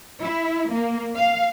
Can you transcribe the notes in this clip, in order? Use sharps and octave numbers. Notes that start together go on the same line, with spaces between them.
E4
A#3
F5